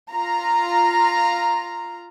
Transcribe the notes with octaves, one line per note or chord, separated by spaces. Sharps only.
F4 A#5